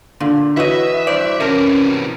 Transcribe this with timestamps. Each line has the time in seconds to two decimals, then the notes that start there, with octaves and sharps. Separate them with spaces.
0.20 A#2 D3
0.57 E3 E4 F#4 B4 C#5 D#5 E5
1.07 G2 C5 D5
1.40 C3 E3 C#4 A#4 A5